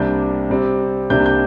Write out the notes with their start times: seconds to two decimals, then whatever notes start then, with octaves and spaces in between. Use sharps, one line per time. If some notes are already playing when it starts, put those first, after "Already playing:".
Already playing: C2 C3 G3 A#3 D4 G6
0.50 C3 G3 C4
1.10 C2 C3 G3 A#3 D4 G6
1.26 G6